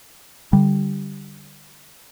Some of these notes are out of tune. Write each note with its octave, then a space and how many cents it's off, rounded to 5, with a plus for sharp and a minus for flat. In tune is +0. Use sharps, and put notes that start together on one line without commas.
D3 +0 G3 +0